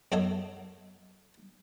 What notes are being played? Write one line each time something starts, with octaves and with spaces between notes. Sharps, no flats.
F#2 F#4 A4 C#5 D#5